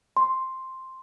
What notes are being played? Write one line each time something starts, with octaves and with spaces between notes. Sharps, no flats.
C6